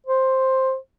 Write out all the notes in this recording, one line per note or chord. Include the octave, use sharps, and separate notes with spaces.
C5